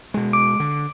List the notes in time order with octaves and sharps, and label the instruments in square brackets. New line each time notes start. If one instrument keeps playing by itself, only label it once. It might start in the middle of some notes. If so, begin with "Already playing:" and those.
[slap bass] B2 G#3
[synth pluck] D6 D7
[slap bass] D3